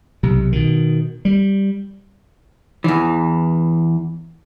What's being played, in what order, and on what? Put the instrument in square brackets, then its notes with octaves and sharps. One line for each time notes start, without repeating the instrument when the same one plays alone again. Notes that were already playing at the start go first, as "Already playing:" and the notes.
[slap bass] B1 C3
B2 D#3
G3
[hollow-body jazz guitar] E2 E3